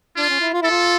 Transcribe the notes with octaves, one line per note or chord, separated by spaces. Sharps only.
D4 F4
C#4
E4
F4
E4 A4
F4